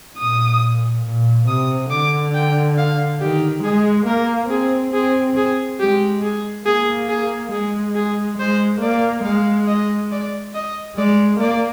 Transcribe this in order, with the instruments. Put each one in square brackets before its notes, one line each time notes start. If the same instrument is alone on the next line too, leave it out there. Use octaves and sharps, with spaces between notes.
[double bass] A#2 [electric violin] D#6
[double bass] A#2
[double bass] C3 [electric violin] D#6
[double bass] D3 [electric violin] D6
[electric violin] G5
F5
[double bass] D#3 [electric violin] G4
[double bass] G#3 [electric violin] G#4
[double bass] A#3 [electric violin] A#4
[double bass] C4 [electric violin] G#4
[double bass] C4 [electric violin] G#4
[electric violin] G#4
[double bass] G#3 [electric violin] G4
[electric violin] G#4
[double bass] A#3 [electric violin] G#4
[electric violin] G#4
[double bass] G#3 [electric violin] G#4
[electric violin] G#4
[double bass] G#3 [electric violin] C5
[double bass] A#3 [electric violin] D5
[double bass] G#3 [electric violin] F5
[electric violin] D#5
D5
D#5
[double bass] G#3 [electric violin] D5
[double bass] A#3 [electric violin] D5